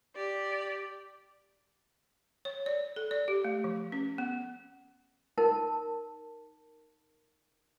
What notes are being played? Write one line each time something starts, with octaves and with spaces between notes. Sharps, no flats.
G4 D5
C#5
D5
A4
D5
G4
A3
F3
C#4
B3
D#4 A#4 A5